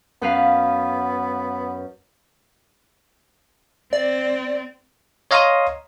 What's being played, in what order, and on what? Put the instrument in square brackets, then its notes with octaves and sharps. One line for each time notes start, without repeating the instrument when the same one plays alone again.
[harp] F#2 B4 F5 [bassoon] B3
[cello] C4 [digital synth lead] D5
[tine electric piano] C#5 D#5 F5 A#5 C6 D#6